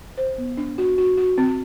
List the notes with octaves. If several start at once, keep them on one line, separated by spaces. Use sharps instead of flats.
C5
B3
D4
F#4
F#4
F#4
C4